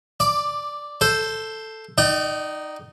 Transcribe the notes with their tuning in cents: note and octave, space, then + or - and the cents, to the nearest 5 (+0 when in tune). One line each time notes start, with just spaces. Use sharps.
D5 +0 D6 +15
A4 +5 C5 +0
D#4 +0 D5 +30 G5 -40